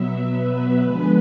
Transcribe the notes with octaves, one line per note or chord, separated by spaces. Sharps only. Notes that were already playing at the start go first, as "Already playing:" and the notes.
Already playing: B2 F#3 B3 E5
B4
D3 F3 G#3 B3 B4